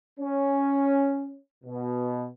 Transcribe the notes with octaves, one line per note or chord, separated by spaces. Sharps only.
C#4
B2